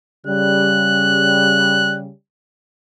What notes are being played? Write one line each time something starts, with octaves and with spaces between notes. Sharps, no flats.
C#3 G3 F#6